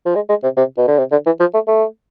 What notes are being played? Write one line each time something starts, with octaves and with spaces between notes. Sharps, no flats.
F3
G#3
G#3
C3
C3
B2
D3
C3
D3
E3
F3
A3
A3